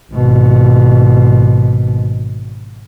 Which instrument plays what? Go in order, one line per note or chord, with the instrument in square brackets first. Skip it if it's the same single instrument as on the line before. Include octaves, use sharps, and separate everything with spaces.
[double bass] G#1 B2